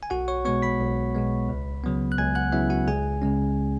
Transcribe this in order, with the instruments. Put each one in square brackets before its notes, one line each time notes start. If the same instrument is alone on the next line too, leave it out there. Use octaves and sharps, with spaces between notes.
[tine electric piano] G#5
B1 F#4 F#5
C#5 C#6
B2 G#3 B3 C#5 C#6
B5 B6
B1
B2 G#3 B3
C#2
C#3 F#3 B3
F#6
C#2 G#5 G#6
F#5 F#6
C#3 F#3 B3 E4 E5
F#4 F#5
C#2 G#4 G#5
C#3 G#3 C#4